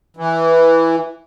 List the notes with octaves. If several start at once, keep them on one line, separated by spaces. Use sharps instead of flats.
E3